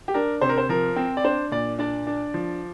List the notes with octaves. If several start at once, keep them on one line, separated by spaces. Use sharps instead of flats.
G4
D4 A#4
C3 C5
A#4
C5
F3 A#4
C4
D5
D4 C5
A#2 D5
D4 D5
D4
F3